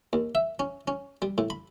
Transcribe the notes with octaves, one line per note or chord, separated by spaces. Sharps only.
D#2
E5
C#4
C#4
G3
A2
B5